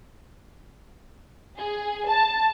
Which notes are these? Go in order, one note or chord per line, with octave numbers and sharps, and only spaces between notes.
G#4
A5